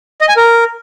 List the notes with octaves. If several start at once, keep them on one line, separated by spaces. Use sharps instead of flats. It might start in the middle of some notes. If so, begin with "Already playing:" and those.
D#5
G#5
A#4